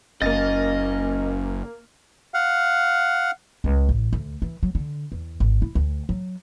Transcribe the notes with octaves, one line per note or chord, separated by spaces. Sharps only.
F#1 A#3 C#4 D#5 A6
F5 F#5
C#2
A1
D2
E3
F#3
D3
E2
G#1
E4
D2
F#3